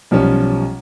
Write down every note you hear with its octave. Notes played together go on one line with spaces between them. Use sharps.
B1 F3 G3 C#4